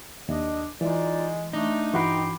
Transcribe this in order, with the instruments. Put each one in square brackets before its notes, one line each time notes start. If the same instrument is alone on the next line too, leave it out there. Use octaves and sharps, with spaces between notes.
[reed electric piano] D#2 [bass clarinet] D4 [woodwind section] D#5
[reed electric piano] E3 [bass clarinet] G#3 [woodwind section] D#4 F4 D5
[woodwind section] A3 [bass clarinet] D4 [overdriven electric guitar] D#4
[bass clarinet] G2 [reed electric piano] E3 F#4 B5 [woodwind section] G5 C6 D6